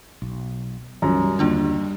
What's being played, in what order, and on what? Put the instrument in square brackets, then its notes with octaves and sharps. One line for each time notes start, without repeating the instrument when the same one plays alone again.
[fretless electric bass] B1
[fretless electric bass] B1 D#3 F3 [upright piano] F#2 A#5 [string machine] G3
[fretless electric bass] D#2 D3 [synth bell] A#3 D4 F4